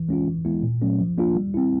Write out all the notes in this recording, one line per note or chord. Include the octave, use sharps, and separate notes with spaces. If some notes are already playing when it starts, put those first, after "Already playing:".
Already playing: E3
G#3 C#4 F4
E3
G#3 B3 E4
A#2
F#3 A3 C#4
F3
A#3 D4 F4
G3
C4 E4